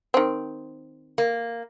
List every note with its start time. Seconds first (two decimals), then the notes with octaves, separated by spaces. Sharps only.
0.14 D#3 C4
1.18 A#3